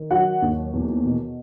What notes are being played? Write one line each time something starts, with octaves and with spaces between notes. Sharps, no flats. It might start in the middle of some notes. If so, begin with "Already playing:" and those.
Already playing: D#3
F#3 F#4 F#5
D#2
E2
B2